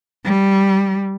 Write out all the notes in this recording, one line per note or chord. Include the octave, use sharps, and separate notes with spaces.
G3